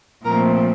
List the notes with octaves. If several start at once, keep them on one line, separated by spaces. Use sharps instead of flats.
A#2 F3 A3 C4 A#4